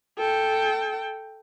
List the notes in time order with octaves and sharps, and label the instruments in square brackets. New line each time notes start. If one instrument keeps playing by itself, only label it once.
[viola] A4 G5